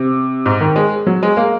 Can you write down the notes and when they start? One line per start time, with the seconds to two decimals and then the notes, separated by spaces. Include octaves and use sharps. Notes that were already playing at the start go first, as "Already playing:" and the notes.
Already playing: C3
0.46 G#2
0.61 D#3
0.76 G#3
1.07 F#3
1.23 G#3
1.37 A#3